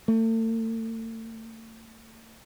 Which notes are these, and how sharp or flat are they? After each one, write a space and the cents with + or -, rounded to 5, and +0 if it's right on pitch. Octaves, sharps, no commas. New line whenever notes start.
A3 +40